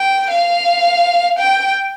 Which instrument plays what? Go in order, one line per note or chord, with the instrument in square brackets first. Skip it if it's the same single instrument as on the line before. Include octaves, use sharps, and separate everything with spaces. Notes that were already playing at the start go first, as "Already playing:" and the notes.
Already playing: [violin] G5
F5
G5